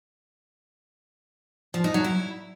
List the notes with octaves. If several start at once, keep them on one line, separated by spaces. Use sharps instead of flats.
F3
D#4
F#3
E4